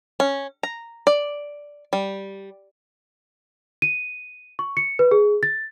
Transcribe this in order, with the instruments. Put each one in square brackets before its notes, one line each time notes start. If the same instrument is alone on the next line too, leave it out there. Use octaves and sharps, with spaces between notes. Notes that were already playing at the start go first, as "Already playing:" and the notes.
[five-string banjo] C#4
A#5
D5
G3
[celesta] D#7
C#6
C#7
B4
G#4
A6